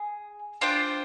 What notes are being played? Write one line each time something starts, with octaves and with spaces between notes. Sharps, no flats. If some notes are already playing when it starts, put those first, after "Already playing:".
Already playing: G#4
D4 F4 C5 G5